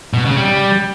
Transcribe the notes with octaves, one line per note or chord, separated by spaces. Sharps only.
B2
C#3
G3